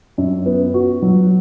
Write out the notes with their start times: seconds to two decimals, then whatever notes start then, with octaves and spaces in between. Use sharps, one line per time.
0.18 F#2
0.46 B3
0.74 F#4
1.02 F#3